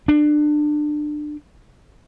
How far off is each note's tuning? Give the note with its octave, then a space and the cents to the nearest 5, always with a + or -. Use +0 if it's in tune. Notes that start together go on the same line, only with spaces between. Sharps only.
D4 +25